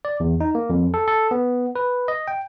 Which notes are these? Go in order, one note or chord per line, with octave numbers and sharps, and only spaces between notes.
D5
E2
D#4
A#3
F2
A4
A4
B3
B4
D#5
G5